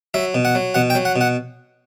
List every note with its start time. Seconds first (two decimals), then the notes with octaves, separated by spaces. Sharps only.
0.14 F#3 E5
0.35 B2
0.45 F#5
0.55 F#3
0.74 B2 F#5
0.90 G5
0.95 F#3
1.05 F#5
1.16 B2
1.21 F#5